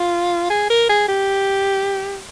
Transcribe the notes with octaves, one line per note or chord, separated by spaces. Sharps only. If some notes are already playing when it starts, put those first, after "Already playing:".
Already playing: F4
G#4
A#4
G#4
G4